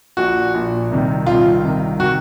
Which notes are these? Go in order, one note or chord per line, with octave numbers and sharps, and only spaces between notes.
A#1 A#2 F#4
A#1 A#2
C2 C3 D#3
C2 C3 D#3 F4
C2 C3 D#3
C3 D#3 F#4